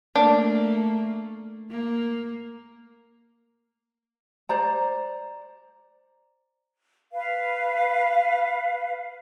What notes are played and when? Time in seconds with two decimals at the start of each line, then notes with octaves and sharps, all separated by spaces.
0.16 A3 A#3 D4
1.70 A#3
4.49 C5 D5 A#5
7.13 B4 F5